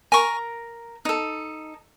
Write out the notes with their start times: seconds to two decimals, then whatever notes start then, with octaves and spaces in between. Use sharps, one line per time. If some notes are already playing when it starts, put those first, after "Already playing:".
0.12 A#4 G#5 A#5 C#6
1.05 D#4 A4